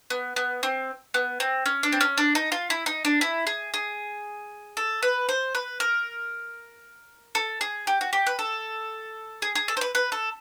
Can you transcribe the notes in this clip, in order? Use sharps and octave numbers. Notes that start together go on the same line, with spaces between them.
B3
B3
C4
B3
C4
C#4
D4
C4
C#4
D4
D#4
F4
E4
D#4
D4
E4
G#4
G#4
A4
B4
C5
B4
A#4
A4
G#4
G4
F#4
G4
B4
A4
G#4
G#4
A4
C5
B4
B4
A4